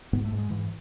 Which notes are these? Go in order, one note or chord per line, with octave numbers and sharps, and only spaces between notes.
G#2 B3
A3
G#2
G#3
G#2 E3